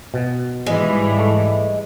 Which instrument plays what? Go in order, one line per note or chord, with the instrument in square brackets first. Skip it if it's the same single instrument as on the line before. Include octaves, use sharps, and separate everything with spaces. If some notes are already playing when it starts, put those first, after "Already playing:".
[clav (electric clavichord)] B2
[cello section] G#2 E3 G3 [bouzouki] G#3
[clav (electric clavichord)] A3